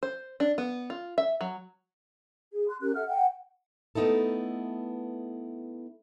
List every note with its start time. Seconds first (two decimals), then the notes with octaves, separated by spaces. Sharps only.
0.03 C5
0.40 D4
0.58 B3
0.90 F4
1.18 E5
1.41 F#3
2.54 G#4
2.68 C6 F#6
2.81 C#4 G4 A#4 F#6
2.95 A4 E5 F#5 F6
3.07 F#5 G5
3.95 A3 B3 D#4 E4 A4